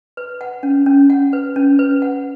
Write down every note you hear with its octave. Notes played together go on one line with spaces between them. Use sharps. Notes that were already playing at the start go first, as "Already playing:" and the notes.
B4
F#5
C#4
C#4
F#5
B4
C#4
B4
F#5